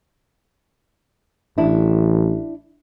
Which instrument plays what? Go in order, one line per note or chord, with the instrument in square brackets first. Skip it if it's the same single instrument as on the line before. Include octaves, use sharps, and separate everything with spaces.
[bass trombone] A1 [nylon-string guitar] D4 E4